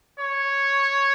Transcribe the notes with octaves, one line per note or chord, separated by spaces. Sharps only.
C#5